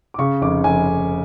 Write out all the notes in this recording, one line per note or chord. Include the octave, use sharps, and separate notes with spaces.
D6
C#3 C#6
F1 D6
F1 G#5
F1